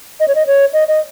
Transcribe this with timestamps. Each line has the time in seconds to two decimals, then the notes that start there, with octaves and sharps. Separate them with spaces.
0.20 D#5
0.28 C#5
0.35 D#5
0.47 C#5
0.73 D#5
0.88 D#5